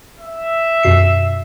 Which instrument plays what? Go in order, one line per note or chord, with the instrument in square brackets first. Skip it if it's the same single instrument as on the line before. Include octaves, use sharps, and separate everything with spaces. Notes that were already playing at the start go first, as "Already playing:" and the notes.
[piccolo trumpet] E5
[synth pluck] F#2 B2 C7